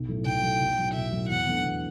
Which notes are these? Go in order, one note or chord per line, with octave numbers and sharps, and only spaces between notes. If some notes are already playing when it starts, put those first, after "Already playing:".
Already playing: B1
A2 F#3 A3
B1 G5
A2 F#3 A3
B1
A2 F#3
B1 E5
A2 F#3
E2 F#5
B2 F#3 A3 D4
E2